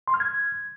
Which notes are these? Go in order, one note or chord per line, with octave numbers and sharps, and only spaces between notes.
C6
F6
G#6